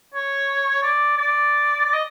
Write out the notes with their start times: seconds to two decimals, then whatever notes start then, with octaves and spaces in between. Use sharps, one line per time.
0.14 C#5
0.83 D5
1.17 D5
1.85 D5
1.94 D#5